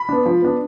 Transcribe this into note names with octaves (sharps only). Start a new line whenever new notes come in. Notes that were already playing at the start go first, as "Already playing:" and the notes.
Already playing: B5
B3 D4
F3
B3 D4